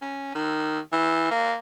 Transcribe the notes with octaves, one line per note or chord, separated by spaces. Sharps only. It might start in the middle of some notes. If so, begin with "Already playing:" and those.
C#4
D#3
E3
A#3